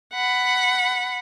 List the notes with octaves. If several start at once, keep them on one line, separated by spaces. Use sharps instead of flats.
F#5 B5